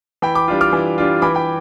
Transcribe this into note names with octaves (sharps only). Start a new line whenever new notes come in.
E3 G5 B5
B5 D6
G3 D4 F4
D6 F6
E3
G3 D4 F4
E3 B5 D6
G5 B5